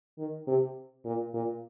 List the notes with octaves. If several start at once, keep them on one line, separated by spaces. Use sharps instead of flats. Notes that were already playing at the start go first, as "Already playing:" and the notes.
D#3
C3
A#2
A#2